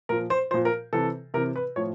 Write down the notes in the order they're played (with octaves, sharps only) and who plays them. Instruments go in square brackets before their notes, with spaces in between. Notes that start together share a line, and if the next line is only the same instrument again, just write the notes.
[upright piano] A#2 F3 A#4
C5
A#2 F3 C5
A#4
C3 E3 A4
C3 E3 A#4
B4
A2 F3 C#5